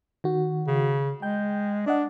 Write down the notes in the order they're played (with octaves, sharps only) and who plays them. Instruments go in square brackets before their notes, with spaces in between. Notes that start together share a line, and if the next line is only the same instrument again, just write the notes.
[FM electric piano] D#3 F#4
[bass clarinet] C#3
[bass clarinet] G#3 [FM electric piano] G5 G6
[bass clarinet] D4 [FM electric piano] D5 D#5 F#5